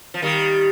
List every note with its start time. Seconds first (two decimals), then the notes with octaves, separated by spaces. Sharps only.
0.14 F3
0.22 D#3 G3